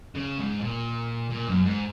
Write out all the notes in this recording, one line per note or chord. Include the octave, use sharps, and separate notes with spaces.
C#3
G#2
A#2
A#2
F#2
G#2